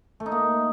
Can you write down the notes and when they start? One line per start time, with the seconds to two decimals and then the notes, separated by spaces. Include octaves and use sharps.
0.20 A3
0.26 D#4
0.32 A#3